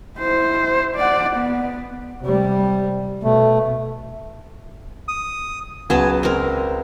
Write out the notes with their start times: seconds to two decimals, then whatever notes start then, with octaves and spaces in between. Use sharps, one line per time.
0.19 E4 C5
0.96 D5 F#5
1.36 B3
2.22 C3 G3
3.23 B2 A3
5.08 D#6
5.90 C#2 F#3 B3 G#5 A5
6.23 G#3 C4 A#4